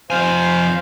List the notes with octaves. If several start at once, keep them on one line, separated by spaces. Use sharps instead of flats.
F2 C5 F5 G#5